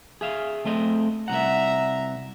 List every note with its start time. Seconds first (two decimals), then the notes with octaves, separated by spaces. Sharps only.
0.21 G#4 E5 F5
0.65 A3 C4 D#5
1.28 C2 F#2 E5 F#5 A#5